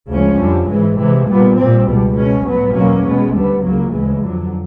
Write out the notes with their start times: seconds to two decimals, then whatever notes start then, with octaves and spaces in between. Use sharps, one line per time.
0.11 D2 C#3 F3 G#3 C#4
0.41 F2 D3 G3
0.70 G#2 E3 G#3
1.00 C3 E3 G#3
1.29 A#2 G3 B3
1.58 A#2 G3 C4
1.88 C#2 B2 G3
2.17 B2 G#3 C#4
2.46 A2 F#3 B3
2.75 E2 B2 F#3 A#3 C#4
3.06 B2 G#3 B3
3.35 D2 D3 G3 B3
3.64 C#2 C#3 F#3 A#3
3.93 D2 C#3 E3 G#3
4.23 F2 D3 F#3